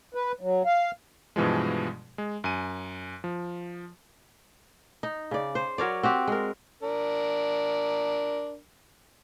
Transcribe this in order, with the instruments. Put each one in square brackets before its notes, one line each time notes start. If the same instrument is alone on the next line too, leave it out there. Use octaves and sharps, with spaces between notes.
[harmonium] B4
F#3
F5
[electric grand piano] G2 B2 E3 F3 G#3
G#3
F#2 G#5 D#7
F3
[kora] D#4
C#3 D5
C5
F#3 A#4 C#5 D5
C4 F#4 G4
G#3 A#4
[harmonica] D4 A#4